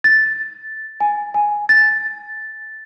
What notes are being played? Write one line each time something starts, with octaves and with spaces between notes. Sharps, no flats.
A6
G#5
G#5
A6